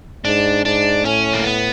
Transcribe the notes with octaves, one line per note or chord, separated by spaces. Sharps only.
G#2 D4
G#2 D4
A2 C#4
A#3
B3